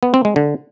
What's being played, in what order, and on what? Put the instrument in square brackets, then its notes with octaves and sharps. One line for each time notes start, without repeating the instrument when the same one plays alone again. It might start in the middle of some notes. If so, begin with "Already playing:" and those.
[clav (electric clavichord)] B3
C4
G#3
D3